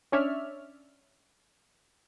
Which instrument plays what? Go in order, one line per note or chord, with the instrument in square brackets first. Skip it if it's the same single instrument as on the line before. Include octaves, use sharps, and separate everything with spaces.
[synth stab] C#4 D4 C#5 D5 E5 F6